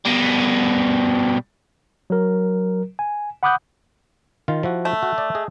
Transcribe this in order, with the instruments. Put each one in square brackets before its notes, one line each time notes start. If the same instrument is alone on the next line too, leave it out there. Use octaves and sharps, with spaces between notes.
[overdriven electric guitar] B2 G3
[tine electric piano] F#3 A#4
G#5
F#5 B5 D6 D#6 F#6 G6
[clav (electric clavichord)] D#3 F4 F5
F3 E4 F#4
[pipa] A3
[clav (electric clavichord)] F#4
D5
G#4 D#5